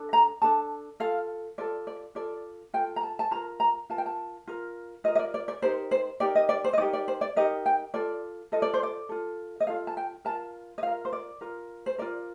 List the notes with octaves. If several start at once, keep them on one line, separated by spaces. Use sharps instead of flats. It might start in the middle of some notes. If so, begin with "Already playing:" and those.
Already playing: D4 A4
A#5
D4 A4 A5
F4 A4 F5
F4 A4 D5
D5
F4 A4 D5
F4 A4 G5
A#5
A5
A5
F4 A#4 A#5
A#5
F4 A#4 A5
G5
A5
F4 A#4
F4 A#4 D#5
D#5
D5
D5
D5
D#4 G4 A#4 C5
C5
D#4 G4 A#4 D5
D#5
D5
C5
D#5
D#4 G4 A#4 D5
D5
C5
D5
D#4 G4 A#4 D#5
G5
F4 A4 D5
F4 A4 D#5
D5
C5
D5
F4 A4
D#5
F4 A4 F5
A5
G5
F4 A#4 A5
D#5
F4 A#4 F5
C5
D5
F4 A#4
C5
F4 A#4 D5